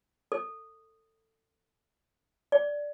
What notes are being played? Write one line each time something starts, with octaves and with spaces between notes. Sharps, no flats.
A4
D5